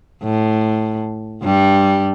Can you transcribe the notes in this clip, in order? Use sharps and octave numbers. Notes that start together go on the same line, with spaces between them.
A2
G2 G3